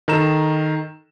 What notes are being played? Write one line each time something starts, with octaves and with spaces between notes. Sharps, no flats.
D#3 A4 A#5 E7